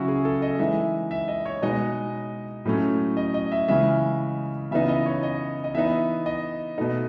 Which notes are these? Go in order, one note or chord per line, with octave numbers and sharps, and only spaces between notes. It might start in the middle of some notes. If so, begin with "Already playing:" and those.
Already playing: C#3 F#3 C#4 E4 F#4
G#4
A4
D#5
E3 G#3 D#4 E5
E5
D#5
C#5
B2 G#3 D#4 D#5
A2 F#3 A3 C#4
D#5
D#5
E5
C#3 E3 G#3 C#4 E5
C#3 E3 B3 D#4 E5
D#5
C#5
D#5
D#5
E3 B3 D#4 E5
D#5
B2 A3 D#4